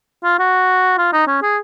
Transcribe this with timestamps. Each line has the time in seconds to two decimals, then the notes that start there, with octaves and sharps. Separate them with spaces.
0.24 F4
0.39 F#4
0.98 F4
1.13 D#4
1.27 C#4
1.42 G#4